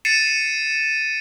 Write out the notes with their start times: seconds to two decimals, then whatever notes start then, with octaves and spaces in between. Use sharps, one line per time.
0.05 A6 C7 C#7 D#7 E7